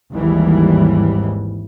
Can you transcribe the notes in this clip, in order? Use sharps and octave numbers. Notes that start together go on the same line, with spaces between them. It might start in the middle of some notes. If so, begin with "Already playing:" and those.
G#1 D#2 G#2 E3 G3